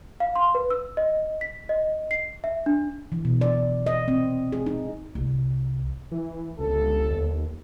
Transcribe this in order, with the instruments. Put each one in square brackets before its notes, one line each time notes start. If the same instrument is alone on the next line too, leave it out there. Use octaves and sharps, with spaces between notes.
[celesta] F5
C6
B4
E6
D#5
B6
D#5
C7
E5
D4
[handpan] E3
B2
D5
D#5
C4
G#4
D#4
[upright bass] C2
[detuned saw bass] E3
[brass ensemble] G1 A4 [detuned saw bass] C#2
[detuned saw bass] D#2